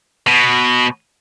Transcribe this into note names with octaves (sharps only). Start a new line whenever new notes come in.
B2